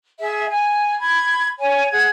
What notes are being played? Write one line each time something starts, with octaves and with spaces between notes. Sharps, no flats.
G#4 E5
G#5
B5 G#6
C#5 G#5
G#4 F#5 G#6